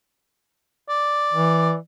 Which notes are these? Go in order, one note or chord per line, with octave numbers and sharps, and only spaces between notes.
D5
E3